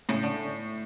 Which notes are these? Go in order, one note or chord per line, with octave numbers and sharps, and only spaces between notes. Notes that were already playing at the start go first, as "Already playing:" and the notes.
A2 C#3
D3